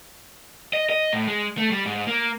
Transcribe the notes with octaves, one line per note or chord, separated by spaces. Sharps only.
D#5
D#5
A2
G#3
A3
G3
G#2
A#3